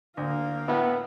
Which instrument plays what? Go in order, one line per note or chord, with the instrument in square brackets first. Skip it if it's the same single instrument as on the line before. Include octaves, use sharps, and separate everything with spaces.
[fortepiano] D2 [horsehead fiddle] A#3 F5
[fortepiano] A2 E4 E5 [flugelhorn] B3